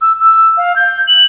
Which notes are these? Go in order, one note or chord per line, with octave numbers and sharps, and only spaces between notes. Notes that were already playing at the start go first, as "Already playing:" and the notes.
E6
E6
F5
G6
F#7